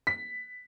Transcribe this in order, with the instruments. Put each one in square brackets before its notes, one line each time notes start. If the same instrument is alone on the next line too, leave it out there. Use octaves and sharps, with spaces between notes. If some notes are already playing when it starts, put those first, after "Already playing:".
[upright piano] B6